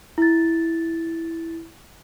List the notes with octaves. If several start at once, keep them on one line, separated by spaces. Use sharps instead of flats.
E4 A6